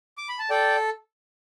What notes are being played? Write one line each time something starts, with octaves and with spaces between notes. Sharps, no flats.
D6
B5
A5
A4 D5 G5